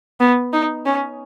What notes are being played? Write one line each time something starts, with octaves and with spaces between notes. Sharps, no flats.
B3
D#4
C#4